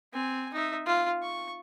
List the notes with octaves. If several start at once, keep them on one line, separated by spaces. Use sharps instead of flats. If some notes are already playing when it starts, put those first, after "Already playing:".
C4 G#5
D#4 E5
F4
C#6